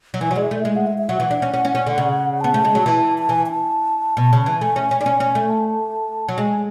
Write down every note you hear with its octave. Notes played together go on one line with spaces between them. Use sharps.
F#3
E3 G#5
F#3
G#3 D5
E5
A3
G#3 E5
F#5
E5
E5
F#3 F#5
E3
D4
C#4
C#4
C#4
C#4
D3
C#3
B3 A5
A3
G#3
F#3
E3
A5
E3 G#5
G#5
A5
B2
C#3
E3
A3 G#5
C#4
C#4
D4
C#4
C#4
A3
A5
F#3
G#3 G#5